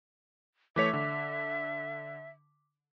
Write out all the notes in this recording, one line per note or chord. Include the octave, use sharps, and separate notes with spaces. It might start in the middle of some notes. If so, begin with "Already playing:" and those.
E3 A3 C#5 E5 D6 B6 F7
D3